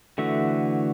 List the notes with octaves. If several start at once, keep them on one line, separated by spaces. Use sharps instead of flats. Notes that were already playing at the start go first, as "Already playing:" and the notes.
D3 E3 A3 F#4 E5